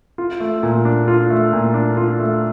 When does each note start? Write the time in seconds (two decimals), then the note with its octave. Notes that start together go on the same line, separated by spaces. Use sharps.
0.18 F4
0.40 A3
0.63 A#2
0.85 D4
1.08 F4
1.30 A3
1.53 A#2
1.74 D4
1.97 F4
2.19 A3